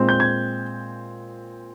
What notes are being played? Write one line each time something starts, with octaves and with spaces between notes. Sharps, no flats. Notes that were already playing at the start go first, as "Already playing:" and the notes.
Already playing: A#2 G#3 C4
G6
G#6